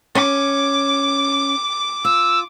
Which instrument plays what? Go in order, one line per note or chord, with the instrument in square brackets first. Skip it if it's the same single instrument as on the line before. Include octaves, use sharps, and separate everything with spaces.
[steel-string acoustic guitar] C#4 [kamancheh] D6
[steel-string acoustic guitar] F4 [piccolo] E6